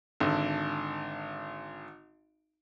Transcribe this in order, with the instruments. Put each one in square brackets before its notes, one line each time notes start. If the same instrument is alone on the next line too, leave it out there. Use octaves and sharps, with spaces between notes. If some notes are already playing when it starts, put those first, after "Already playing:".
[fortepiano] G#1 D3